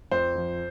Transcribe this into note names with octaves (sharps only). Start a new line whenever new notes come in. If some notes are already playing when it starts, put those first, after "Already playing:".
F2 C5
F3